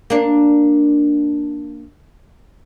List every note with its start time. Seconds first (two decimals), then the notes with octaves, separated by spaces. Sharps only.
0.10 A#3 D4